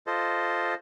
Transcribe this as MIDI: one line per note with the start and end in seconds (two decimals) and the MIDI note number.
0.07 0.74 65
0.07 0.74 69
0.07 0.74 72
0.07 0.74 75